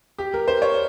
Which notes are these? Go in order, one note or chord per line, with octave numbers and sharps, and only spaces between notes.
G4
A#4
C5
C#5